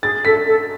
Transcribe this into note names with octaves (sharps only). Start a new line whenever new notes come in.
G#4 A6
A4 B6
A4